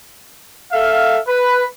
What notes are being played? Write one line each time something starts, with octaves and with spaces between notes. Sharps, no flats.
A4 E5 F5
B4